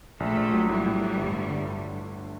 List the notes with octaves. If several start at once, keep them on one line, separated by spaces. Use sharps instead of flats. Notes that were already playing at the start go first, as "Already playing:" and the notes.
A#1 A3
A#1
F#3
A2 G3
A2
A3
G1
G1
D3